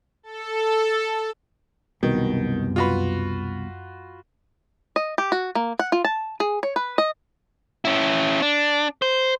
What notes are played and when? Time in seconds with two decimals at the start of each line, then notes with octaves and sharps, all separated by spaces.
0.23 A4
2.03 C2 F#2 B2 D#3
2.76 F4 F#4 B4
4.96 D#5
5.18 G4
5.32 F#4
5.55 A#3
5.79 F#5
5.92 F4
6.05 A5
6.40 G#4
6.63 C#5
6.76 B4
6.98 D#5
7.85 C#4 E4
8.42 D4
9.02 C5